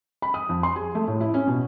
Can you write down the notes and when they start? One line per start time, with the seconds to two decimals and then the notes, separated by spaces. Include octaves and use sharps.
0.22 B5
0.34 D#6
0.49 F2
0.63 C6
0.76 G#4
0.95 A3
1.08 A2
1.21 E4
1.34 C#4
1.47 B2